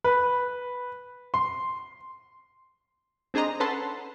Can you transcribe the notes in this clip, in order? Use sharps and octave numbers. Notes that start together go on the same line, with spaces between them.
B4
C6
C4 D4 G#4 C5 D#5 A#5
C#4 A4 B4 F#5 A5 C6